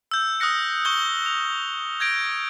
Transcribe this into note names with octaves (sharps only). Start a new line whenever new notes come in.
E6 G6
D#6 F6 F#6 A#6 C#7
C#6 G6 G7
F7
G6 G#6 A#6 D7